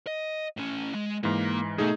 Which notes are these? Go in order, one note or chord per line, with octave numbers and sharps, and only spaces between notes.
D#5
A2 C#4
G#3
G#2 E3 A#3
B2 A3 D#4 G#4